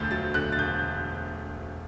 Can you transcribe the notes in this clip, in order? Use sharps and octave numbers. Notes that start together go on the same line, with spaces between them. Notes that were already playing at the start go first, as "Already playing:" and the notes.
Already playing: E1 D2 D3 G6 A6
F#3 A6
D3 F#6
A6
E1 G6